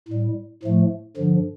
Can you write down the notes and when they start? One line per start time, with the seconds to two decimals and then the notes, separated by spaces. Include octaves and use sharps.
0.08 A2 G3
0.63 A2 F3 A3
1.16 G2 D3 F3